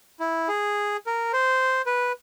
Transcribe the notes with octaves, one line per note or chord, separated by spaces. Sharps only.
E4
G#4
A#4
C5
B4